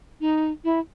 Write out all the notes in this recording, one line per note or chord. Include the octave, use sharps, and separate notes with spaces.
D#4
E4